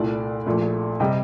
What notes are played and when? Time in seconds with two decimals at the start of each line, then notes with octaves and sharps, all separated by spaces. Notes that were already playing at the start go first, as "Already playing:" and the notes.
Already playing: C2 A#2 A3 D5
0.46 A#1 A#2 A3
1.00 C3 G3 D#5 G5